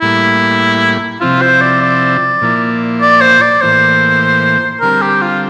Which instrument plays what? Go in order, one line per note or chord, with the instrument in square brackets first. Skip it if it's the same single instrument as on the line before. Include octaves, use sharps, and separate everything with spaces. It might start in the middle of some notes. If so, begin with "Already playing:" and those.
[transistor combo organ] A2 G3 A#3 [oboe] E4
[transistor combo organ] C3 F3 C4 E4 [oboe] F4
[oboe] C5
D5
D5
[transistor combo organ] A#2 F3 A#3 E4
[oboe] D5
C5
D5
[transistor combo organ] A2 E3 A#3 [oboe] C5
[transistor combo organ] D3 G3 C4 [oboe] A#4
[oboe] G4
F4